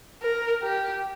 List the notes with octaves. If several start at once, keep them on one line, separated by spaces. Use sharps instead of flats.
A#4
G4